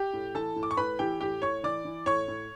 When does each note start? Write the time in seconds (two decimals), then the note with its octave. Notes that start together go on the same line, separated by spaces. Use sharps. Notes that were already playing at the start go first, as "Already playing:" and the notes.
Already playing: G4 G5
0.13 A2
0.35 E3 A4 A5
0.56 A2
0.63 D6
0.71 C#6
0.77 A2 B4 B5
0.99 E3 G4 G5
1.21 A2 G4 G5
1.42 A2 C#5 C#6
1.63 E3 D5 D6
1.85 E3
2.06 A2 C#5 C#6
2.28 A2